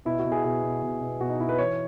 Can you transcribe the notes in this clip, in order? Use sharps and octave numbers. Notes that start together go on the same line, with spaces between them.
B2 E4
F#4
B2
G#4
B2 G#4
B2
B2
B2
B2 F#4
D#4
B2 E4
B4
E3 C#5